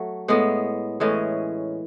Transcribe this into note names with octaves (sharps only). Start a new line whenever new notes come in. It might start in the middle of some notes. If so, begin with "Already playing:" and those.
Already playing: F#3 A3
A2 G#3 B3
A2 E3 G#3 C#4